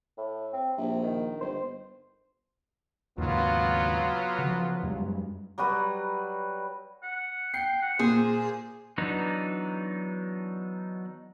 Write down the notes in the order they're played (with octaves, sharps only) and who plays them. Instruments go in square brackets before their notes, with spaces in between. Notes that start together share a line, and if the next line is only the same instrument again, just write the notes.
[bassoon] A2
C4
[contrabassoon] A#1 [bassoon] C3
[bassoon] D#3
[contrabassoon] G1 [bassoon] C5
[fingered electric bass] D#2 G#2 C#3 [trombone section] F#3 B3 F4
[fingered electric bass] C#3 F3
F#2 G3 G#3
[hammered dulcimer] F#3 G3 F#4 B4
[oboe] F#5
[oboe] G5 [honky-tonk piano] C7
[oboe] F#5
[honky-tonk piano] A#2 [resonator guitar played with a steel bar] G#4 [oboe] C5
[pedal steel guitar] E3 F#3 B3 D4 D#4